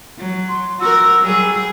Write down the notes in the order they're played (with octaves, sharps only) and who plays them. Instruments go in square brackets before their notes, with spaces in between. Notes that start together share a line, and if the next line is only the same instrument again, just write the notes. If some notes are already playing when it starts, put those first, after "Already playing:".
[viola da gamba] F#3
[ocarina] C6
[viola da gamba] F#4 A#4 [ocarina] E6
[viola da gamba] F#3 G3 G#4